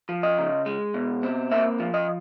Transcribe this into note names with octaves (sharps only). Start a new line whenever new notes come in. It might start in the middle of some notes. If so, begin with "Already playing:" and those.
F3
D#5
C#3
G#3
B2
C4
A#3 E5
F3
D#5